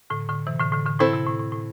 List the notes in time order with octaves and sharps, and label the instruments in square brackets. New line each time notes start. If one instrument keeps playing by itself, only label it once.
[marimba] A2 D3
A2 D3
C3 E3
A2 D3
A2 D3
A2 D3
[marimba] A2 [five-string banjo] C4 E4 A4 C5
[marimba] C3
A2
A2
A2